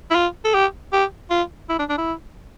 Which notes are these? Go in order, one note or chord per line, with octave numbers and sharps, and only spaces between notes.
E4
F4
A4
G4
G4
F4
E4
D4
D4
E4